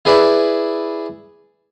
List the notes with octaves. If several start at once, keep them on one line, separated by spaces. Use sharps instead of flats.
E4 G#4 B4 D5 E5